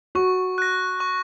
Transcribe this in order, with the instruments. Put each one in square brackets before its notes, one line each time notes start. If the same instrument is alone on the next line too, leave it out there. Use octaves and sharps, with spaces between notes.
[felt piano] F#4 [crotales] C#6
[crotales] F#6 A#6
C#6